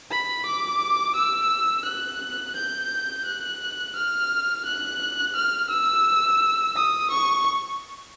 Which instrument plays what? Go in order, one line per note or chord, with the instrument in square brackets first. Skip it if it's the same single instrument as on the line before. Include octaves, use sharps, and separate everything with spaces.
[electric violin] B5
D6
E6
F#6
G6
F#6
F6
F#6
F6
E6
D#6
C#6